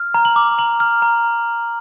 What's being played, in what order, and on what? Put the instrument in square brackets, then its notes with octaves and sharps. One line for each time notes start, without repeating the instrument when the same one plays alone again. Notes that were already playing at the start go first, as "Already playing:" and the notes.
Already playing: [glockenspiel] F6
A#5
F#7
D6
A#5 F#7
F6
A#5